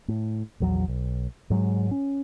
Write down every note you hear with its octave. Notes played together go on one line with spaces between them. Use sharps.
A2
A#1 E2 F#3
B1
G#2 F#3 G#3
C#4